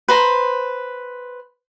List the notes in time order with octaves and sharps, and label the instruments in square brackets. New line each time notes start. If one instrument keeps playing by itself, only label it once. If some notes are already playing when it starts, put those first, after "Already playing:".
[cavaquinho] B4 C5 A#5